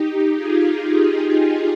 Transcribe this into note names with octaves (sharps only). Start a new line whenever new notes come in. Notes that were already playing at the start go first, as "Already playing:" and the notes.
Already playing: D#4 G4
F4 G#4